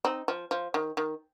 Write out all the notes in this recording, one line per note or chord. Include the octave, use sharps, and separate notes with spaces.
C4 D#4
F3
F3
D#3
D#3